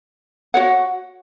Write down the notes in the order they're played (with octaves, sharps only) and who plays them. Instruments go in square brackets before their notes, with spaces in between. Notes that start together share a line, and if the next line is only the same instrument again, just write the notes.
[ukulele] F#4 C#5 F#5